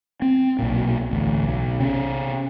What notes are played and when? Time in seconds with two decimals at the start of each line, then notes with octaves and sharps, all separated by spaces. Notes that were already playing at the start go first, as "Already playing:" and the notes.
0.22 C4
0.59 B1 A#2
1.11 A1 D2
1.44 B1
1.80 C3 C#4